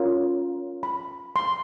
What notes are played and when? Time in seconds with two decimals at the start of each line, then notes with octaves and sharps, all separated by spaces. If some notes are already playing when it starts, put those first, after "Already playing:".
Already playing: C#4 F4 A#4 C#5
0.83 B5
1.36 C6